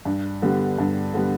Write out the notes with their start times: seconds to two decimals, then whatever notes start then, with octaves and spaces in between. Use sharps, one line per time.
0.05 G2
0.42 D3 G3 B3
0.79 G2
1.14 D3 G3 B3